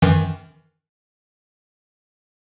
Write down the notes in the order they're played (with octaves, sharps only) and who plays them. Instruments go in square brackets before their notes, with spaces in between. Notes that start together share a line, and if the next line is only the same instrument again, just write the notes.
[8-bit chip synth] F#2 D#3 E3